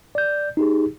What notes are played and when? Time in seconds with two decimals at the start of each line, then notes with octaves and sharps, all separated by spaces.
0.15 D5 G6
0.57 D#4 G4 G#4